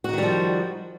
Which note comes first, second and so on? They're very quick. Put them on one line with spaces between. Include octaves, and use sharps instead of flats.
F#4 D#4 D#3 G3 F3